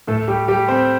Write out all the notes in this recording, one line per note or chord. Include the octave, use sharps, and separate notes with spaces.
A2 A3 A4
G3 G4
G3 G4
C4 C5